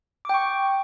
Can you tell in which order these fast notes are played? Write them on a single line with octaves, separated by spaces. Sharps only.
D6 G5 C#6